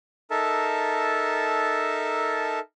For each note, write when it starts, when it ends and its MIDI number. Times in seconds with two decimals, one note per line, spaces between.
0.31 2.59 63
0.31 2.59 69
0.31 2.59 70
0.31 2.59 76
0.31 2.59 81